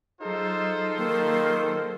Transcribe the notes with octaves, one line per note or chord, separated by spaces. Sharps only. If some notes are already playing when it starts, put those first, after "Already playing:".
F#3 D#4 F4 G#4 A4 C5
D#3 A#3